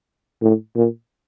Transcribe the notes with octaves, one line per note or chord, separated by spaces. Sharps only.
A2
A#2